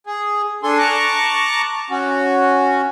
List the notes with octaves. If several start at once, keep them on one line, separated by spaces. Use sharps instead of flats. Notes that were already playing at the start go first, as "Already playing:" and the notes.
G#4
D4 A4 G#5 C6
A5 A#5 C#6 D6 F#6
C#4 F#4